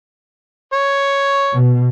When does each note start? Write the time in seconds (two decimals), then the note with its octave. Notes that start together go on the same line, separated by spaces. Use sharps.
0.73 C#5
1.53 B2